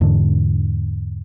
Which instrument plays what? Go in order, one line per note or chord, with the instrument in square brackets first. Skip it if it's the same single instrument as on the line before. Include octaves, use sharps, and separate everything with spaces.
[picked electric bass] E2 G#2 D3